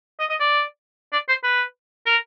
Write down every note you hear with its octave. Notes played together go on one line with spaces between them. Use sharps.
D#5
D#5
D5
D5
C5
B4
A#4